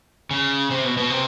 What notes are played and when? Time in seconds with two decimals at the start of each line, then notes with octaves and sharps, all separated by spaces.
0.31 C#3
0.71 C3
0.84 B2
0.97 B2
1.10 C3